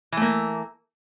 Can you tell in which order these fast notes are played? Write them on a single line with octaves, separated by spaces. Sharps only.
E3 A3 A#3